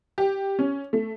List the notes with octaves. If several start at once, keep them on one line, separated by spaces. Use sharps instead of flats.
G4
C#4
A3